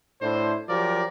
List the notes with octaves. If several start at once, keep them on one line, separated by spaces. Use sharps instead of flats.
A2 D4 E4 C5
F3 F#3 G4 A#4 D5